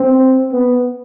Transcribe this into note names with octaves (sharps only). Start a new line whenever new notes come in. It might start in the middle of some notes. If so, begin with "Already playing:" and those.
Already playing: C4
B3